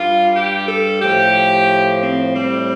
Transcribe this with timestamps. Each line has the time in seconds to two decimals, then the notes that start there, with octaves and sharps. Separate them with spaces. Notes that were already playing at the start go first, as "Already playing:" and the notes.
Already playing: G2 G3 F4
0.34 G4
0.68 A4
1.01 A2 F3 G4
2.01 C4
2.35 A2 G3 C4